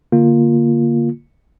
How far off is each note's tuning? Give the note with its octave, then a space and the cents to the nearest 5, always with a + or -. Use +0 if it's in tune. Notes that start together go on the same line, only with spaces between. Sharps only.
D3 -25 A#3 +0 F4 +0